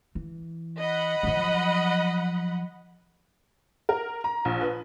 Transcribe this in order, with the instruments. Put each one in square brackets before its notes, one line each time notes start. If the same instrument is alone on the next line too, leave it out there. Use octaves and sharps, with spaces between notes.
[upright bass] E3
[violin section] D#5 F#5 B5
[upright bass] F3 F#3
[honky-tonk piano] A#4
A#5
A#1
B4